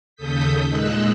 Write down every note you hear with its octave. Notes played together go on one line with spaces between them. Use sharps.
D#2 C#3 A4 D#6 G6 B6
A#2 G#3 D#4 D#5 E6 F#6